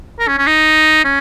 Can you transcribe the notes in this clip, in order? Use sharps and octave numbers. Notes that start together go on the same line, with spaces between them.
A#4
C#4
C#4
D#4
C#4